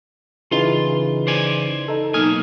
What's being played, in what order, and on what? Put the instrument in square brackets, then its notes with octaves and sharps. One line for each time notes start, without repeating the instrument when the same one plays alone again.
[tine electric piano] C#3 E3 D#4 [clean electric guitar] F4 C6
[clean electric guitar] C5 D5 G#5
[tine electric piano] D#4 A4
[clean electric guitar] B1 A#3 G#5 [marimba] D#4 [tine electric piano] F6